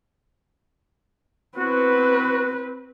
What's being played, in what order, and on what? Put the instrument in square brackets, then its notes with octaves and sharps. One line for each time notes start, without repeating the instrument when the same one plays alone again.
[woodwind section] B3 E4 F#4 [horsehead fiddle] C4 B4